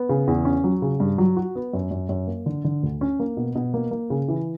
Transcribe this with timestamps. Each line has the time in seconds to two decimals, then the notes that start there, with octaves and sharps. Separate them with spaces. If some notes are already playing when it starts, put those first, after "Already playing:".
Already playing: B3
0.09 C#3
0.27 E2
0.45 C#4
0.64 F#3
0.82 C#3
1.00 G2
1.18 F#3
1.37 F#4
1.55 B3
1.73 F#2
1.91 F#2
2.09 F#2
2.27 A#3
2.46 D3
2.64 D3
2.83 D2
3.01 C#4
3.19 A#3
3.37 B2
3.55 B2
3.74 A#3
3.91 A#3
4.10 C#3
4.28 E3